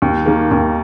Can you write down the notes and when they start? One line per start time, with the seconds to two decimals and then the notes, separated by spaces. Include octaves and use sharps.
0.02 D#2
0.26 D#3 A#3
0.51 D#2